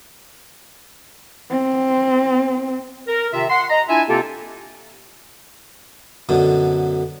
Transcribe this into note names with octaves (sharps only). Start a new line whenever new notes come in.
C4
A#4
C3 D#3 F4 E5
F#5 C6
D#5 A#5
D4 E4 F4 E5 G#5
C3 A#3 C4 F4 G4 A4
F#2 B2 D3